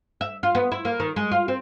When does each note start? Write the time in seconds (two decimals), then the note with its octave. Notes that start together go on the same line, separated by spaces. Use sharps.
0.21 E5
0.43 F4
0.55 B3
0.72 E4
0.85 A#3
1.00 D#3
1.16 G#3
1.32 F4
1.48 C4